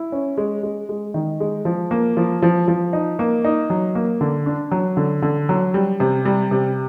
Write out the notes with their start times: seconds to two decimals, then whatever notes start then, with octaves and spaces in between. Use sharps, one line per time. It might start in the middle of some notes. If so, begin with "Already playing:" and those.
Already playing: E4
0.12 C#4
0.37 G#3
0.63 G#3
0.89 G#3
1.14 D#3
1.40 G#3
1.65 F3
1.91 A#3
2.17 F3
2.42 F3
2.68 F3
2.93 D#4
3.19 A#3
3.44 D#4
3.70 F#3
3.95 A#3
4.21 D3
4.46 D4
4.71 F#3
4.97 D3
5.22 D3
5.49 F#3
5.74 G3
6.00 C3
6.25 G3
6.51 C3